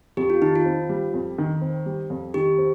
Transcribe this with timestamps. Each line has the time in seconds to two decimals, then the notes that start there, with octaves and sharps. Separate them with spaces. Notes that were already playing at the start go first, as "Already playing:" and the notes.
0.17 F2 G4
0.30 F4
0.42 D#3 D#4
0.55 F4
0.65 C4
0.90 G3
1.14 F2
1.38 D#3
1.61 C4
1.86 G3
2.10 F2
2.34 D#3 G4
2.58 C4